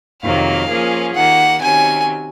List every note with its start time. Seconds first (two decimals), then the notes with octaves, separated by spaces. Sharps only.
0.23 F2 C3 D#3 F#3 A#3 F5
0.69 F3 A#3 C#4 F4 G#4
1.15 D#2 D#3 A#3 F#5
1.61 C3 D#3 F#3 C#4 G#5